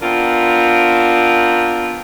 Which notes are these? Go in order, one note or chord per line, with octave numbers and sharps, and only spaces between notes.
B3 C4 D4 F4 A#4